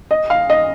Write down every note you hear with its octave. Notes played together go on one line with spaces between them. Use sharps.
D#5
F5
D#5